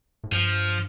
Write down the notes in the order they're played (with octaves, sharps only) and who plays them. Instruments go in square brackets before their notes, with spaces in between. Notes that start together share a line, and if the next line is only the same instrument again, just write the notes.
[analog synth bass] A2
[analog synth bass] G2 [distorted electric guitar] F3